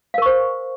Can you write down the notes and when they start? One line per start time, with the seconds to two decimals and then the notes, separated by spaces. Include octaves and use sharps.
0.14 F5
0.18 A#4
0.22 C#6
0.26 C5